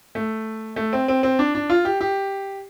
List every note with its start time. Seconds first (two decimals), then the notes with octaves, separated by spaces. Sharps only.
0.15 A3
0.76 A3
0.93 C4
1.08 C4
1.23 C4
1.39 D4
1.55 D4
1.70 F4
1.85 G4
2.01 G4